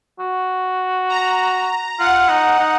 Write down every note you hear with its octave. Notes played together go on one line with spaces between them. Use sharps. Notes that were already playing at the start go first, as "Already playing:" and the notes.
F#4
A#5
F4 F#5
D#4
D#4